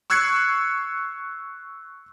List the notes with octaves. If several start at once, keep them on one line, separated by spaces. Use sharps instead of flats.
C#6 E6 F#6 G#6 C7 C#7